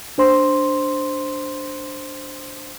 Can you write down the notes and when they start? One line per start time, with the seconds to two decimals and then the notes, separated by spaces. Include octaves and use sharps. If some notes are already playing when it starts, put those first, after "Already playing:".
0.18 D4 C5 C6